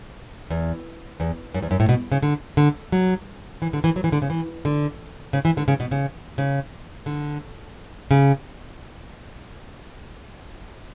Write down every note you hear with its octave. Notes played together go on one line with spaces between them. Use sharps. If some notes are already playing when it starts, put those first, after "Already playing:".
E2
E2
F#2
E2
F#2
A2
B2
C#3
D3
D3
F#3
E3
D3
E3
F#3
E3
D3
C#3
E3
D3
C#3
E3
D3
C#3
B2
C#3
C#3
D3
C#3